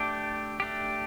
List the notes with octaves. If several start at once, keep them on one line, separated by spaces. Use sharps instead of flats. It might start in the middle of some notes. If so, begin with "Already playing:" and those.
Already playing: A3 D4 G4
A3 D4 G4